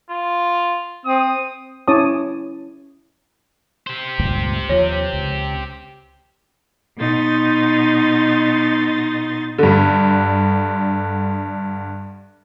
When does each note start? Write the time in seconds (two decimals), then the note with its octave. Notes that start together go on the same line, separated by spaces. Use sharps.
0.10 F4
1.05 C4 D#6
1.88 C#4 E4 C#5 A5 D6 D#6
3.87 G4 C5
4.19 C#2 G2 A#2
4.69 D#2 F3 C#5
5.13 C#2
6.97 B2 D#4 C6 A6
9.58 G2 D3